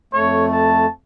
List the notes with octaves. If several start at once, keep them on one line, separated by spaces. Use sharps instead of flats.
F2 A3 C#5
A5